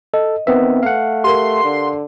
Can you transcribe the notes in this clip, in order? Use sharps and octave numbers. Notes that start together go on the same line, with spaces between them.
A4 D#5
D#3 B3 C4 B4 E5
A3 F5 F#5
G4 A#4 C6
D3